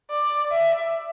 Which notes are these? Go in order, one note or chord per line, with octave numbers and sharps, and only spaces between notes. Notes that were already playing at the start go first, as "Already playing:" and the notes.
D5
E5